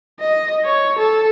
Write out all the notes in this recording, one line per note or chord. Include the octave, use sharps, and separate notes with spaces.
D#5
C#5
A4